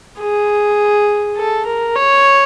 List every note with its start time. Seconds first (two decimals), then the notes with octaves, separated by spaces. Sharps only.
0.20 G#4
1.37 A4
1.66 A#4
1.95 C#5